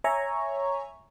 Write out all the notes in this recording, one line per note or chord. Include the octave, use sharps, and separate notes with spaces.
C#5 E5 G#5 A#5 C#6